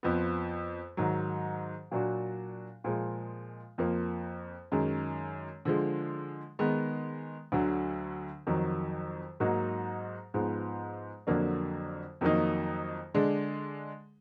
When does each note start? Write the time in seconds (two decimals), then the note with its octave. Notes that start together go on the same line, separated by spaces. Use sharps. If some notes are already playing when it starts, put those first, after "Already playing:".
0.03 F2 F3 B3
0.97 G#2 D#3 F#3
1.91 A#2 F#3 D4 F#4
2.84 A#2 F3 G#3
3.78 F2 F3 A#3
4.72 F#2 D#3 G#3
5.65 D3 F3 G#3
6.59 D#3 G#3 B3
7.52 D2 D3 F#3
8.47 F2 D#3 F#3
9.40 G#2 F#3 A#3 D#4 F#4
10.34 G#2 F3 G#3 B3
11.27 F2 D3 F#3 A#3 D4
12.21 F2 D#3 F#3 A#3 D#4
13.14 D3 G#3 D4